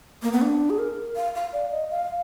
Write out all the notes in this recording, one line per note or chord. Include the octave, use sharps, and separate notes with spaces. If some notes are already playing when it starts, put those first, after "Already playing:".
A#3
B3
D4
G#4
A#4
F5
F5
D5
D#5
F5